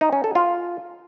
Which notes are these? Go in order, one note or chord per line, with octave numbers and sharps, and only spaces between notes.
D#4
C#4
A4
F4